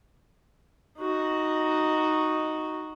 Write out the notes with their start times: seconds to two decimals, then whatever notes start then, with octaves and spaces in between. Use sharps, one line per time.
0.98 D#4 F#4